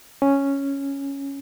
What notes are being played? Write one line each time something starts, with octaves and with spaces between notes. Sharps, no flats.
C#4